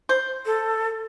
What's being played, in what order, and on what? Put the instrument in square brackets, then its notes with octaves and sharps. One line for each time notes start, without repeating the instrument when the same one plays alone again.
[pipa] C5
[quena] A4